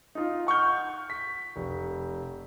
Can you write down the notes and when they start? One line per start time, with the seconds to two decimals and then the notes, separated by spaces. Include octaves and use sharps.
0.15 D#4 F4
0.47 F#5 C#6 F6 G6
1.10 B6
1.56 F1